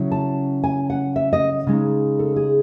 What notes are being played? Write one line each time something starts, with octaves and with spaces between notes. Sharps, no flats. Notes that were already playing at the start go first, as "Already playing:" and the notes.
Already playing: C#3 F#3 C#4 E4
A5
G#5
F#5
E5
D#5
C#3 G#3 D#4
A4
G#4